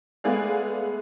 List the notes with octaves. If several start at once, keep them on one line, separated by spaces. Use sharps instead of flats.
G#3 A3 B3 G#4 D5 F5